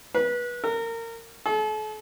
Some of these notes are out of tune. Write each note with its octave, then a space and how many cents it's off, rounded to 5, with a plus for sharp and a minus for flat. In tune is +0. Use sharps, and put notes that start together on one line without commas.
B4 -25
A#4 -25
A4 -40